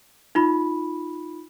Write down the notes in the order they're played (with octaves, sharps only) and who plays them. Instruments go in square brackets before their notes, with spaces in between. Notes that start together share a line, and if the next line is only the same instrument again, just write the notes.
[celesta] D#4 F4 B5